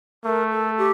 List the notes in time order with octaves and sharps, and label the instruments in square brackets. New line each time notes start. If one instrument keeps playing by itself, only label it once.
[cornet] A3 [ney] A#4
[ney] A4
G4